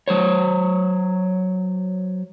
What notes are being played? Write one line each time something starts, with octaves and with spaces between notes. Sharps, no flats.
F#3 C5 C#5